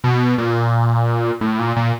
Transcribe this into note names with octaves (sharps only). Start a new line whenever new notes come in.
B2
A#2
A2
A#2
A#2